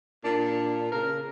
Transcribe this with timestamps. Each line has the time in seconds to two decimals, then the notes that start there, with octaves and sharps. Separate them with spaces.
0.24 A#2 D4
0.92 C#3 A#4